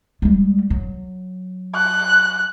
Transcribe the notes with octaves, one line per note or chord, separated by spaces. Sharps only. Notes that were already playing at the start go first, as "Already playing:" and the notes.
G3 G#3
F#3
F#6